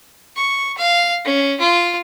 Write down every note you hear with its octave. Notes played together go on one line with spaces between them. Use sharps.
C#6
F5
C#4
F4